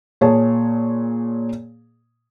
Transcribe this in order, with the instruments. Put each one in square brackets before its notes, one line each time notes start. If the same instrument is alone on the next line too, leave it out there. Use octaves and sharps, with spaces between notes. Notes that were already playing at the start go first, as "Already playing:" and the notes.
[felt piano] A#2 G#4 C#5 A5